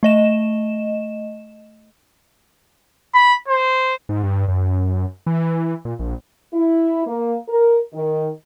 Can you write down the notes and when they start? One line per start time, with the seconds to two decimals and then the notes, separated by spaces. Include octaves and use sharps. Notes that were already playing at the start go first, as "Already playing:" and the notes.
0.03 A3 D#5 E7
3.14 B5
3.48 C5
4.09 G#2
4.23 G2
4.48 F#2
5.27 E3
5.85 A#2
5.99 A#1
6.54 E4
7.06 A#3
7.48 A#4
7.94 D#3